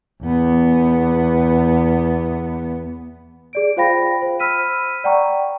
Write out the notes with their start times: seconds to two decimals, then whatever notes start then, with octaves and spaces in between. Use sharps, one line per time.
0.23 E2 B3
3.53 G#4 D5 D7
3.77 F4 C5 F5 G5 B5 A#6
4.22 C5
4.40 B5 E6 F6 B6 D#7
5.04 D5 F#5 G5 A#5 C#6